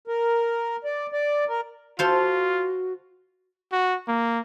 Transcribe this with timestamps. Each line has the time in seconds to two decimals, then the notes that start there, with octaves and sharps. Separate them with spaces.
0.08 A#4
0.85 D5
1.12 D5
1.48 A#4
1.99 F4 F#4 A4 C5 F5
3.72 F#4
4.08 A#3